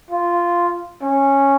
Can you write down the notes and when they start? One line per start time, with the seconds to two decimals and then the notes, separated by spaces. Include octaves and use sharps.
0.11 F4
1.02 C#4